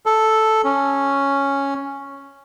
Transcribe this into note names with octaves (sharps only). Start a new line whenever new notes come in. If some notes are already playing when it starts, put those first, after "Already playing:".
A4
C#4